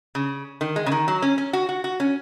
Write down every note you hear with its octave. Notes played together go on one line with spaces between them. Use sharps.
C#3
D#3
G#3
C#3
D#3
F#3
C#4
C#4
F#4
F#4
F#4
C#4